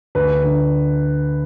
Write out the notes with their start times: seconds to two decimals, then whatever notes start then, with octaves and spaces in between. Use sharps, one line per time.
0.15 D2 B4
0.44 D3